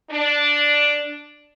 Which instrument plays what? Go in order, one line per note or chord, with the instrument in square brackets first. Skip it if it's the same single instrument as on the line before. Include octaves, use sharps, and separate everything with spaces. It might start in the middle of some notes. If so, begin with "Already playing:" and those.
[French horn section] D4